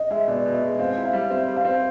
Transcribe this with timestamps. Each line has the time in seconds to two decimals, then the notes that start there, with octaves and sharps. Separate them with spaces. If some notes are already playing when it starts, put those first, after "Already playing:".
Already playing: D#5
0.10 G#3 E5
0.27 B2 D5
0.46 B2
0.54 D#5
0.63 G#3
0.79 C4 F5
0.97 E4
1.05 F5
1.13 G3
1.30 C4 E5
1.48 G3
1.56 F5
1.65 C4